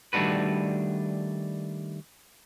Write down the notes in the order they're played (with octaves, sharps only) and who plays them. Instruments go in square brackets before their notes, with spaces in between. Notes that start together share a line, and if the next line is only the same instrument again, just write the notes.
[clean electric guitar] D#3 G3 A3 D4 F#4 B4